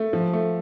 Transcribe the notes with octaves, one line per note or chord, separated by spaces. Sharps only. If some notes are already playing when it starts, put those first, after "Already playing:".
Already playing: A3
F3
A3